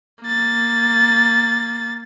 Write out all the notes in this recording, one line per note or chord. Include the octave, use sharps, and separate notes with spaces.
A#3 A6